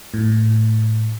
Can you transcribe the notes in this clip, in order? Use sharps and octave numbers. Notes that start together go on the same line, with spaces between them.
A2